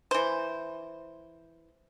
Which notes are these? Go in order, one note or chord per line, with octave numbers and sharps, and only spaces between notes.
E3 C5